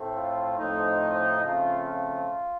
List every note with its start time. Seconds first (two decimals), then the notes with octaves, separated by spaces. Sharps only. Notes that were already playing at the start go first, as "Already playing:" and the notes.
Already playing: A2 A3 C4
0.15 F4
0.58 A2 F3 A3 C4 D#4
1.44 C#3 F3 A3 C4 F4
1.87 F4